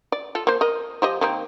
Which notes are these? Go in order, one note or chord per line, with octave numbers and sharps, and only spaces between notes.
D5
F4 A4
A#3 C5
A#4 D#5
F3 G4 D#5
D#3 A#3 C4